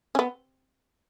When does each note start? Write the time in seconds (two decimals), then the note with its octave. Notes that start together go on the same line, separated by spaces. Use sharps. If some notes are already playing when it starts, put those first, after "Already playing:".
0.15 C#4
0.19 B3